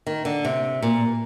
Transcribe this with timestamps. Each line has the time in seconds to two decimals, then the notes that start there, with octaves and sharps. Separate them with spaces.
0.07 D#3
0.25 D3
0.45 C3
0.82 A#2